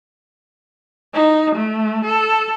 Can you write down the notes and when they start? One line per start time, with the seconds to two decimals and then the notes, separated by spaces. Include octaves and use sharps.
1.14 D#4
1.56 A3
2.06 A4